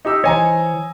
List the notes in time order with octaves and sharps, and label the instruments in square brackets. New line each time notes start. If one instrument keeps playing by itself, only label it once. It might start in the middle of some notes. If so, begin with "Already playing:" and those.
[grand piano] D#4 G4 E6
[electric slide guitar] E3 C5 C#5 [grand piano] D#5 G#5 A#5